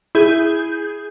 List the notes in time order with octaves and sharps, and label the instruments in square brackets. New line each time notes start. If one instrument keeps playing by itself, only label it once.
[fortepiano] E4 [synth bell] G#4 G6